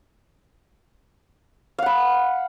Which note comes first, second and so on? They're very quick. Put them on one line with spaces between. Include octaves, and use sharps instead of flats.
F5 F#5 B5